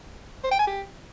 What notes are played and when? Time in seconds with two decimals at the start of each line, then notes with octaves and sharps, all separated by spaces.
0.44 C5
0.51 G5
0.59 G#5
0.67 G4